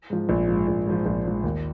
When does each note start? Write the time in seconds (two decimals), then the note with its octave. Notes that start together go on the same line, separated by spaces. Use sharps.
0.10 G#2 F3
0.29 A#1
0.48 G#2 F3
0.68 A#1
0.86 G#2 F3
1.06 A#1
1.25 G#2 F3
1.44 D#2